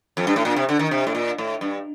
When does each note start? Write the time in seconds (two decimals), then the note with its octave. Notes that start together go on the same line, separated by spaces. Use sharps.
0.17 F2
0.27 G2
0.36 A2
0.45 A#2
0.56 C3
0.69 D3
0.79 D#3
0.91 C3
1.07 A2
1.15 A#2
1.38 A2
1.61 G2